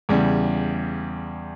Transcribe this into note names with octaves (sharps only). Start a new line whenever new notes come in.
E2 C#3 G3